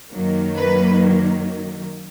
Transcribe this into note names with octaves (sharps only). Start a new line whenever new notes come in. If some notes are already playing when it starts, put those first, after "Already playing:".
F#2 D#3 F#3 A#3
B4